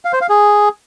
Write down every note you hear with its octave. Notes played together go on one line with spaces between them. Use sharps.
F5
C5
F5
G#4